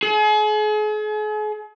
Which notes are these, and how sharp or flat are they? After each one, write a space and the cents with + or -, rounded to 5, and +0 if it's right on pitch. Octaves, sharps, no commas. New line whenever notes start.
G#4 +40